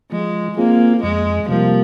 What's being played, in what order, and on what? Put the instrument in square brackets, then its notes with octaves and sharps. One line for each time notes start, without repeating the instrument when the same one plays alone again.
[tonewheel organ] F3 [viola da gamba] G#3
[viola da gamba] A#3 [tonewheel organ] C4 F4 G#4
[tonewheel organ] F2 [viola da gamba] G#3
[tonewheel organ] C3 G3 A#3 [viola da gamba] F3